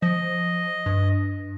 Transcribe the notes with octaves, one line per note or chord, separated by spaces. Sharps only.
F3 D#5
G2